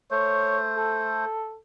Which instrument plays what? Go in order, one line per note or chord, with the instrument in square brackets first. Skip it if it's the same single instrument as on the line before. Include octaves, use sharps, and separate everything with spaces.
[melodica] A3 C5 [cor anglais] C#5
[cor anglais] A4